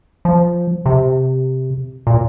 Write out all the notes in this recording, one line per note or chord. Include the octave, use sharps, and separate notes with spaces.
F3
C3
A#2